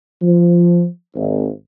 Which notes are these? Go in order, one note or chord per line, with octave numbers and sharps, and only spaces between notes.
F3
G#1